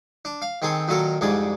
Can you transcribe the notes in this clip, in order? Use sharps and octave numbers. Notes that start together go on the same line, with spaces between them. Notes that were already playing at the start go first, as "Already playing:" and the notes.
D4
F5
D#3 C4 G#4 A4
A#2 D#3 F#3 A4 A#4
C2 F2 G#2 G#4 D5